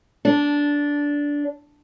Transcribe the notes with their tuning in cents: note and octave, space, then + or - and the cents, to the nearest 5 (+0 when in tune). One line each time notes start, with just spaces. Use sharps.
D4 -15